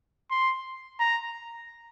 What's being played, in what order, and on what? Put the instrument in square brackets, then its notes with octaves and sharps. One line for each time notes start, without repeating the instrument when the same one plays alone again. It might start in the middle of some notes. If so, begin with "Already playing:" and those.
[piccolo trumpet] C6
A#5